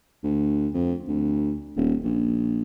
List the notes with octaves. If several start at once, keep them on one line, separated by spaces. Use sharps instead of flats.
D2
F2
D2
D#1
A#1